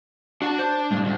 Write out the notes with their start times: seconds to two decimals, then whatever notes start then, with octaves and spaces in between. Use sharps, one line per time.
0.42 D4 F#4 F#5 A5
0.59 C5
0.91 A2 D3 G3
1.04 D2